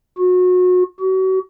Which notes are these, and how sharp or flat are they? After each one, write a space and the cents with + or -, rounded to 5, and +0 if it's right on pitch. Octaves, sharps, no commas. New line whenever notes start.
F#4 -30
F#4 +35